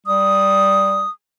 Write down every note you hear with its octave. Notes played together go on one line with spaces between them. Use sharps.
G3 D#6